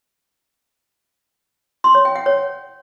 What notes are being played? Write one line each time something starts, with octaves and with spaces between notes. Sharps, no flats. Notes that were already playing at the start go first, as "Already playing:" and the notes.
C6
C#5
G5
F#5
C#5